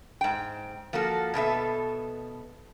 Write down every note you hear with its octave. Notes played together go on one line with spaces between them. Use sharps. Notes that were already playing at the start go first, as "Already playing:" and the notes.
G#2 G5
F3 A#3 F#4 A4
B2 B3 A4 E5